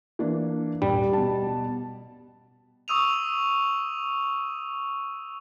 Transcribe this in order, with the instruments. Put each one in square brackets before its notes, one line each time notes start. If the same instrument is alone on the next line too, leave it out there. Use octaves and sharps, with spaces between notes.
[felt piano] E3 A#3 D4
[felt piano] D#1 [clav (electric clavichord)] G3
[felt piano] B2 A5
[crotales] C#6 D#6 E6 D#7 F7